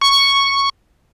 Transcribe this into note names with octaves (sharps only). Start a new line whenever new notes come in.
C#6